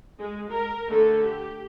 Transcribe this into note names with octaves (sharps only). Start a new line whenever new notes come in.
G#3
A#4
D3 A3 A4
G4